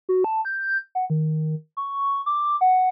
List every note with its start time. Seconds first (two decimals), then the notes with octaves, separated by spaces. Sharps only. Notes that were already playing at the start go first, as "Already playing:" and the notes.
0.09 F#4
0.24 A5
0.45 G6
0.95 F#5
1.10 D#3
1.77 C#6
2.26 D6
2.61 F#5